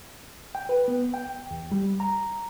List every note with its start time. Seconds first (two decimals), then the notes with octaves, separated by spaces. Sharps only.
0.55 G5
0.69 B4
0.88 B3
1.14 G5
1.51 E2
1.72 G3
2.00 A#5